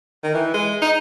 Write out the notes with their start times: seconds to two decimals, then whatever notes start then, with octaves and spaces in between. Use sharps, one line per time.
0.24 D#3
0.34 E3
0.54 G#3
0.82 D#4